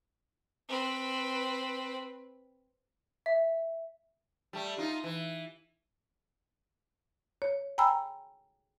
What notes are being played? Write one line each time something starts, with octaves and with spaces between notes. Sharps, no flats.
C4 B4
E5
G3 A3
D#4 F4
E3
C#5
G5 G#5 A#5 B5 E6